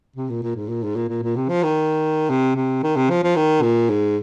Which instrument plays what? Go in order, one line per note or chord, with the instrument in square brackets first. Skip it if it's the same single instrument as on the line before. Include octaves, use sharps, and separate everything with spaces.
[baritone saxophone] C3
A#2
A#2
G#2
A#2
G#2
A#2
A#2
A#2
C3
F3
D#3
C3
C3
D#3
C3
F3
F3
D#3
A#2
G#2